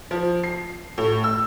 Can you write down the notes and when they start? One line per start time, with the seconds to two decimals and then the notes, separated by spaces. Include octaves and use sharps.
0.11 F3
0.44 C7
0.98 A2
1.24 E6